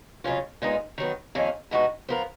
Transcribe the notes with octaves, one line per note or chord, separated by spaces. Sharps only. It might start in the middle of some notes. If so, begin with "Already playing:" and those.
F2 C#3 F#3 C#4 F4
A#2 G#3 B3 D#4 A#4
D#3 F#3 B3
F2 D#3 A#3 C#4 G#4
B2 G#3 B3 D#4 F#4
F3 B3 F4 A#4